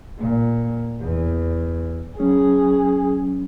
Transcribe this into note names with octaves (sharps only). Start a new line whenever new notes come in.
A#2
E2
F#3 C#4 G#4